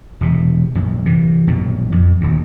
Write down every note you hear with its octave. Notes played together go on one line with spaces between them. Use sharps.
E1 C3
A#1 F#2
C3 E3
A#1 F#2 B2
F2
D#1 D2